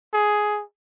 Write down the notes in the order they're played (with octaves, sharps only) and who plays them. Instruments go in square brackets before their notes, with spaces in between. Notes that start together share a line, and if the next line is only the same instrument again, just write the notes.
[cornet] G#4